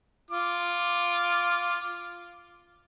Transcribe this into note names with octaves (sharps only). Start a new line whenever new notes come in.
F4 D6